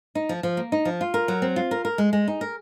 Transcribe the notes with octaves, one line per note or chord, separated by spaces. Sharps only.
D#4
F3
F3
A#3
D#4
F3
F4
A#4
F#3
C4
F4
A#4
A#4
G#3
G#3
D#4
A#4